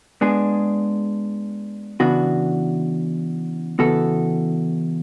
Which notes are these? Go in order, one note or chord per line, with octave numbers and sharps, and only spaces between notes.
G#3 B3 D4 G#4
C#3 E3 B3 D4 F#4
C#3 E3 B3 F#4 A4